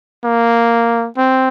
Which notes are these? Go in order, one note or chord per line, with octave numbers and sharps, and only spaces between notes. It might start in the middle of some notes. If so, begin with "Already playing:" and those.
A#3
C4